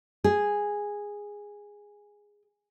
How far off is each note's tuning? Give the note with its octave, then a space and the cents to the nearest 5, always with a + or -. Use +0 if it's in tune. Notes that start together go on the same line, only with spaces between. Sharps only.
G#4 -10